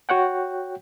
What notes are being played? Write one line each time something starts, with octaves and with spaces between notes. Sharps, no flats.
F#4 C#5 F#5 G5